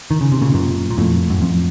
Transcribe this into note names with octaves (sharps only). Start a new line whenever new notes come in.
D#3
C#3
C3
A#2 C#3
F#2 A#2
A#2
F2 A2
F#2
F2